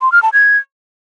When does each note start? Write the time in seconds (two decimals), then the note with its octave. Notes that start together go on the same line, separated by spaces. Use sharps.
0.02 C6
0.12 F6
0.23 A5
0.33 G#6